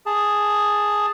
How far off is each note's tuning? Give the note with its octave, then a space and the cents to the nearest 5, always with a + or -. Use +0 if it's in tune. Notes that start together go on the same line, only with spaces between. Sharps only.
G#4 +0 A5 +0